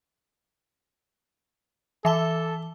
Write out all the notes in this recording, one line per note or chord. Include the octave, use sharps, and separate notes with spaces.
E3 A4 E5 A5 G7